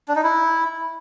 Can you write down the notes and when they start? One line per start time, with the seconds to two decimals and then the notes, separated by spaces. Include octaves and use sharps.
0.08 D4
0.16 D#4
0.23 E4